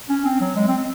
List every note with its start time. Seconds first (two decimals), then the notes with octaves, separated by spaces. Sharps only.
0.09 C#4
0.25 C4
0.41 F#3
0.56 G#3
0.68 C4